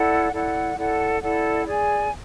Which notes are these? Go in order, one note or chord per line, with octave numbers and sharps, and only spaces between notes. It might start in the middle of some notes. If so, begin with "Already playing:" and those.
Already playing: E4 A4 D5 F#5
E4 A4 D5 F#5
E4 A4 D5 F#5
E4 A4 D5 F#5
G#4 D5 G#5